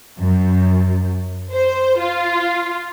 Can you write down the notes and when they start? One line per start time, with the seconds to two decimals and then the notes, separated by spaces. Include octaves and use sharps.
0.19 F#2
1.52 C5
1.99 F4